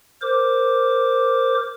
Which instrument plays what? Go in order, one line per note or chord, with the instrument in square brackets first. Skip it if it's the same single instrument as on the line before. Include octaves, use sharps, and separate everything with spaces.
[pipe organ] A#4 C5 D6